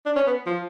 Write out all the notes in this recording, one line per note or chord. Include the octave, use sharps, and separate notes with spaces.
D4
C#4
B3
F3